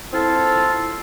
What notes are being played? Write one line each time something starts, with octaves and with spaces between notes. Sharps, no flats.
C4 E4 F4 A4